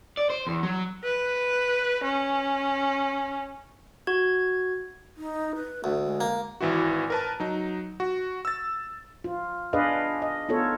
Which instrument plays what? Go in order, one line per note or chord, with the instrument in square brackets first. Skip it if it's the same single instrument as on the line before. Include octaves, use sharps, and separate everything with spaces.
[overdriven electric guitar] D5
C5
E2
F#3
[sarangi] B4
C#4
[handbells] F#4 G#6
[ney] D#4
B4
[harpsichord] D2 [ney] A3
[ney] G#3
[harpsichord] A#3
[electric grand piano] G#1 E3 E4 F#4
A#4 B4 A5
F#3 D#4
F#4
E6 A6
[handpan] F4
D4 G#4 B4 D5 D#5 F5
D#5
B3 D#4 F4 A4 C#5